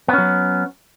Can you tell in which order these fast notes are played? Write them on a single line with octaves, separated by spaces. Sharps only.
B3 C#4 F#3